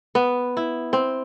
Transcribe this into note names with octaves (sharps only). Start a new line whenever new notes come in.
B3
E4
C4